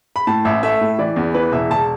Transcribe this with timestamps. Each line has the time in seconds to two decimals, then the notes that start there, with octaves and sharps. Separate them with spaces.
0.16 B5
0.27 A2 A5
0.45 A1 E5
0.63 A3 E5
0.81 A2
0.99 E3 D5
1.16 E2
1.34 E3 B4
1.52 E1 E5
1.71 E1 A5